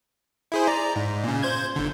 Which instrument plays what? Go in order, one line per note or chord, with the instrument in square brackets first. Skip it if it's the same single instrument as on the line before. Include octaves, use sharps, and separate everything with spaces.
[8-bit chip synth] E4 G#4 C5
D5 A#5
G#2
A#2 C#3
C5 G6 G#6
G1 D3